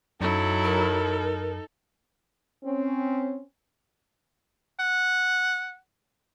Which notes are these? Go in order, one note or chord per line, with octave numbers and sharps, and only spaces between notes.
F#2 F#3 D#4 E4 A4
A#4
C4 C#4
F#5